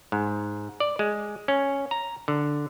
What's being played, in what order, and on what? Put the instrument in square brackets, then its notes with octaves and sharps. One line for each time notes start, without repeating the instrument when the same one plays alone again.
[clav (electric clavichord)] G#2
D5
G#3
C#4
A#5
D3